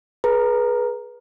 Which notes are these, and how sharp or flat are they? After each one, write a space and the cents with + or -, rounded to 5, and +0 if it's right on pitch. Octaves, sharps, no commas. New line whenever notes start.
G#4 +20 B4 -20 A#5 +0